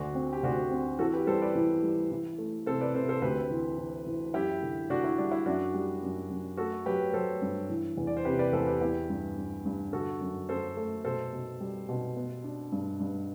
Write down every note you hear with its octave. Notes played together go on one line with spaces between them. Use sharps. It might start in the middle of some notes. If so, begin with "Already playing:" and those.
Already playing: D2 D4 F#4
C4
G4
D2 D4 F#4
C4
E3 F#4 A4
G4 B4
G3 A4 C5
B4 D5
E3
G3
E3
A3
C3 A4 C5
B4 D5
C3 A4 C5
A4 C5
D2 G4 B4
E3
E3
E3
F#2 E4 G4
D3
D3 D4 F#4
E4
G3 D4
E4
F#2 D4 F#4
G3
F#2
F#2
A3 F#4 A4
F#3 G4 B4
F#3 A4 C5
G2
E3
E2
D5
C5
C3 G4 B4
B4 D5
E2 A4 C5
G4 B4
B3 E4 G4
G2
G2
G2
D3 F#4 A4
F#2
F#2 A4 C5
A3
B2 A4 C5
B2
G3
B2
B3
D4
G2
G2